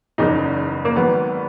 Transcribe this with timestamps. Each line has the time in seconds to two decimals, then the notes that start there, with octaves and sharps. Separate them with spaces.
0.18 F#1 E2 C#3 D#4
0.85 A#3
0.96 G#1 G#2 D#3 F#3 B3